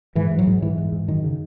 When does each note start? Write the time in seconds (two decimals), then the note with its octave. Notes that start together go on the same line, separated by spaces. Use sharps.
0.15 G#2 E3
0.31 G#2
0.39 F#3
0.47 G#2
0.62 G#2 E3
0.78 G#2
0.92 G#2
1.08 F#2 D#3
1.24 C#3